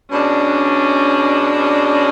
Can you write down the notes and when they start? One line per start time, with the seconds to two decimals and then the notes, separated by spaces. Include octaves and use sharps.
0.11 B2 G#3 C#4 D4
1.57 C#4